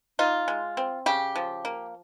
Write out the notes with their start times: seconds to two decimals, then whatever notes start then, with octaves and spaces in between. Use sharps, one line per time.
0.19 D#4 F4
0.48 G#3
0.77 C4
1.06 C#3 G4
1.36 F3
1.65 A#3